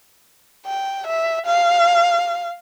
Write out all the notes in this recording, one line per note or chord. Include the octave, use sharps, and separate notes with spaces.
G5
E5
F5